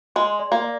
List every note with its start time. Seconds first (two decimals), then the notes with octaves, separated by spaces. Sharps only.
0.16 G#3 C6
0.39 D5
0.52 A#3
0.64 D5